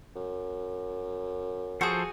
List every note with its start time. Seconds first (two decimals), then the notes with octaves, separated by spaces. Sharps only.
0.16 F#2
1.81 F3 F#4 G#4 A4 C5